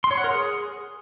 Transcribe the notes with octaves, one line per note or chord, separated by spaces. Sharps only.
C6
C#5
F#5
A#4
G#4